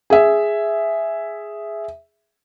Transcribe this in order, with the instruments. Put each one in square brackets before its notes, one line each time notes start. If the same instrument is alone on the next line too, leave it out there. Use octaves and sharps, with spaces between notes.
[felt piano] G#4 E5